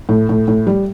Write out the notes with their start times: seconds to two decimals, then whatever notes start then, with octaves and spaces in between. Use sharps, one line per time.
0.09 A2
0.29 A2
0.48 A2
0.67 G3